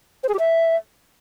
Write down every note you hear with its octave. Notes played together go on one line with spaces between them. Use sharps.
C5
G#4
G4
E5